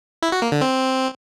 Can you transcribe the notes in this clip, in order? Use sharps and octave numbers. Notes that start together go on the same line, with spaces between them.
E4
F#4
A#3
D3
C4